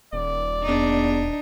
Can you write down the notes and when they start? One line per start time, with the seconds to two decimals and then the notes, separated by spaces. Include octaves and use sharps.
0.13 D#1 D5
0.62 E2 D4 D#4